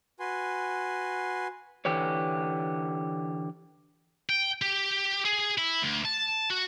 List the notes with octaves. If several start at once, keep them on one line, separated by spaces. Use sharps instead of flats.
F#4 B4 G#5 C6
D3 E3 G4 B4 C#5
G5
G4
G#4
E4
D2
A5
F#4